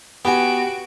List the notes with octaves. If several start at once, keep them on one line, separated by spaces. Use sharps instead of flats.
B3 F#4 G4 G#5 D7